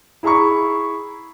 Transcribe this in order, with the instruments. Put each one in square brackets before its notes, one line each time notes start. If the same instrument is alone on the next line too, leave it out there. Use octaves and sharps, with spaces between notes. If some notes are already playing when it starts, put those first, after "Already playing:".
[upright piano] E4 G#4 A#5 B5 C#6